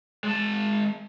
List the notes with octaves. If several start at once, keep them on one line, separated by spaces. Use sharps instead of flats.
G#3 A5